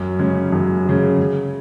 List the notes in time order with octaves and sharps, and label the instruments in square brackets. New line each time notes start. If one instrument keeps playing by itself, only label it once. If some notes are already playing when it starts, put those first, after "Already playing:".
Already playing: [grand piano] F#2
C#3 G#3 C#4
F#2
C#3 G#3 C#4
C#3